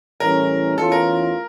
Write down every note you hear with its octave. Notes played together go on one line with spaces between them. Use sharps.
A2 E3 G3 C#4 A#4
E2 E3 A3 C#4 F4 A4
A#4